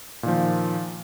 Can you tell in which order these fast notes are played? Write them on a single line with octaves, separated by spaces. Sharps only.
A#2 D#3 F3